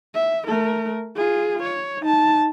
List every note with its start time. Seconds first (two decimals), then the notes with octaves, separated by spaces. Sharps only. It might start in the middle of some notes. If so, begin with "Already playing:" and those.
0.15 E5
0.47 A3 A#4
1.16 F4 G#4
1.63 C#5
2.01 D#4 A5